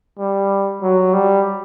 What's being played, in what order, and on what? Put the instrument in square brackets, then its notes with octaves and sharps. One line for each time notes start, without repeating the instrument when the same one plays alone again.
[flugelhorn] G3
F#3
G3